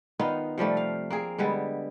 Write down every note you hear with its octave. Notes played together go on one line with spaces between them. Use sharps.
D#3 B3 D#4 F4
C3 F3 G3 A3
F5
A#3 C4 G#4
D3 G3 G#3 B3